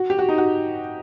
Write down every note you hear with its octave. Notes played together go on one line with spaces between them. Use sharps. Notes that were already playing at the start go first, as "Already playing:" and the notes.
Already playing: F#4
G4
F#4
D#4
F#4